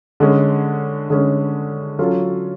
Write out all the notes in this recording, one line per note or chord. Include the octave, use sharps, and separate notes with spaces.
D3 G#3 C#4
D3 G#3 C#4
F#3 C#4 F4 A4